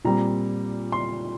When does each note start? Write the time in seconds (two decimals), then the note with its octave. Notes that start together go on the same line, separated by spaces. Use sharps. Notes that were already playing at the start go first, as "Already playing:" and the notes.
0.04 A#2 G3 C4 A#5
0.92 C6